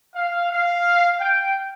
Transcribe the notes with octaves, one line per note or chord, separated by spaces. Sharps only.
F5
F5
G5